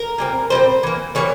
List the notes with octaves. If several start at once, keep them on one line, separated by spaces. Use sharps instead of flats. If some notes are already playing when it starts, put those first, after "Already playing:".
Already playing: A#4
A#2 G3 C4
A#2 G3 C4 C5
E3 A#3
E3 G3 A#3 C#5